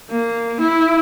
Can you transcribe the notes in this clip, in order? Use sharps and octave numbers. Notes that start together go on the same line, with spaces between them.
A#3
E4